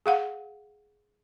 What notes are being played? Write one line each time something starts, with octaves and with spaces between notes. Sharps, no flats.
G#4 F5 F#5